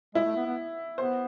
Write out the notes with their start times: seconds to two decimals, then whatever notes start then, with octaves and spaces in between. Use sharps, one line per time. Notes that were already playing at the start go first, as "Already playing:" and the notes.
0.15 G#3 E4
0.25 A3
0.36 B3
0.46 B3
0.98 B3 C5